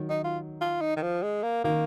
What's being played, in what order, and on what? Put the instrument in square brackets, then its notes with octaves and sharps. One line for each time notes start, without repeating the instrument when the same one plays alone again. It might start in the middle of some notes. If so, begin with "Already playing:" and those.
Already playing: [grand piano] D#3 F#3
[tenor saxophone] D#4
F4
F4
D#4
D#3
F3
G#3
A#3
[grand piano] D#3 [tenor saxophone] A#3